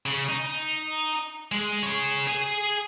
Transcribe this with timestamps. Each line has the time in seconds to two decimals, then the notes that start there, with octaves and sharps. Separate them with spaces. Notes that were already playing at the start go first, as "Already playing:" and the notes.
0.06 C#3
0.29 D#4
1.52 G#3
1.83 G#4 C#5
2.28 G#4 G#5